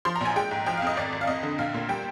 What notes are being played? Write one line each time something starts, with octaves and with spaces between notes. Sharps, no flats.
F3 C6
A#5
A#1 G#5
G#3 G5
G#2
F3 G5
F5
F2 D#5
G#1 D5
G#1
F5
F2 D#5
D3
A#1 F5
A#2
G3 G5